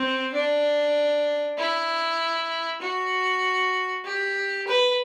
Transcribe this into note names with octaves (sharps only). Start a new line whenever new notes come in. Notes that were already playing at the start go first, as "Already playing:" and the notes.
Already playing: C4
D4
E4
F#4
G4
B4